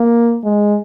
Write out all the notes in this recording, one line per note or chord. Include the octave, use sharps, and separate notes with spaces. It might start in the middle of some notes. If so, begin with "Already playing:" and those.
Already playing: A#3
G#3